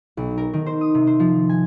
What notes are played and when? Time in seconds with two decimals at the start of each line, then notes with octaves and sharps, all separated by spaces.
0.17 B1
0.38 A#4
0.53 D#3
0.66 C5
0.81 D#6
0.94 C3
1.07 C5
1.20 F3
1.49 G#5